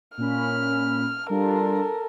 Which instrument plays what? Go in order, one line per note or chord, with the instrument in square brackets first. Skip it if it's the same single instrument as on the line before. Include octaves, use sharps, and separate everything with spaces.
[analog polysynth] A#2 C#4 B5 [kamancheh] F6
[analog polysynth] G3 D4 F4 [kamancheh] A4 A#4